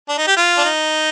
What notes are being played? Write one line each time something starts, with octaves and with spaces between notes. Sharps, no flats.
D4
D#4
G4
F4
D4
D#4